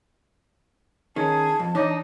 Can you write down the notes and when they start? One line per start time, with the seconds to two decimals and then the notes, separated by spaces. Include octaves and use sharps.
1.16 D#3 C#4 G#4 A5
1.59 F2
1.75 E3 D4 D#4 C#5 D6